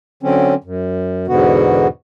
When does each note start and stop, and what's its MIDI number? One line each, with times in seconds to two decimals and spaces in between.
0.23 0.54 50
0.23 0.54 54
0.23 0.54 60
0.23 0.54 61
0.64 1.26 42
1.27 1.87 40
1.27 1.87 44
1.27 1.87 47
1.27 1.87 50
1.27 1.87 59
1.27 1.87 66